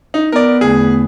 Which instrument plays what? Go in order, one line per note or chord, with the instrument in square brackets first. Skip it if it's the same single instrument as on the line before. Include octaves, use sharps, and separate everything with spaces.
[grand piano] D#4
[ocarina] B3 [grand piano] A#4 D5
[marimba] E2 D3 A3 [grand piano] G#4